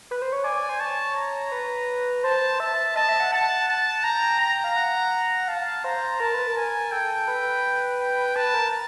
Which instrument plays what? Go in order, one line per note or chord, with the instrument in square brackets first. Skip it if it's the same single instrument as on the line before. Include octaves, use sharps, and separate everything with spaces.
[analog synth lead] B4
C5
C#5
[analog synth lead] D5 [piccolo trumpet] G#5
[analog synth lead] C5
[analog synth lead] C#5 [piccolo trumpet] A5
[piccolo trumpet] A#5
[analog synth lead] B4
[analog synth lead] C5 [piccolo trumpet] A5
[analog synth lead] E5 [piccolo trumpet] A5
[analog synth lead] D#5 [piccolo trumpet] A5
[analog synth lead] E5
F#5
[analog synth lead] F#5 [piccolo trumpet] A5
[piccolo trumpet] A5
[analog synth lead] G5 [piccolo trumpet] A#5
[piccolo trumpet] A#5
[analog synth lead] F5
F#5
[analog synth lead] F5 [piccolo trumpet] A5
[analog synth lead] C5 [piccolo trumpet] A#5
[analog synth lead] A#4 [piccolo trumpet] A5
[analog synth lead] B4
A#4
[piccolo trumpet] G#5
[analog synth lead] A4 [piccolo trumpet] G5
[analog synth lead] B4
[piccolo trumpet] G5
[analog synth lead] B4 [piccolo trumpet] A5
[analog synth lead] A#4